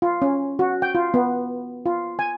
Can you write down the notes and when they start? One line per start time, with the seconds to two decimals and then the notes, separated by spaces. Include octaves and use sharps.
0.02 F4
0.22 C#4
0.59 F#4
0.82 G5
0.95 F4
1.14 B3
1.86 F4
2.19 G#5